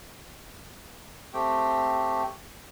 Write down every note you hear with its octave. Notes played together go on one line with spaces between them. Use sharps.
A3 C4 G4 G5